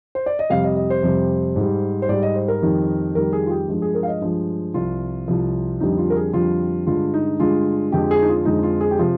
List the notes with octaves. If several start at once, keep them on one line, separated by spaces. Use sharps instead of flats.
C5
D5
D#5
F2 C3 G3 F5
D#5
D#5
C5
F2 C3 G3
G#2
G3
C5
G#2 G3 D5
D#5
C5
A#4
F2 D#3 G3
F2 D#3 G3 A#4
G#4
F4
G4
G2 F3 G#3
G#4
A#4
F5
D#5
G2 F3 G#3
C2 C3 F3 F4
C2 C3 F3
F2 D3 G3 D#4
F4
A#4
G#4
F2 D3 G3 F4
G2 D3 G#3 F4
D#4
G2 D3 G#3 F4
F2 D3 F3 G#3 G4
G#4
D#4
F4
F2 D3 F3 G#3 D#4
F4
G#4
G4
C3 F3 F4